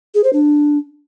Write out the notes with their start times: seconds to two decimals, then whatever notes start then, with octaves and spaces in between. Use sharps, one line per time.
0.14 G#4
0.24 C5
0.33 D4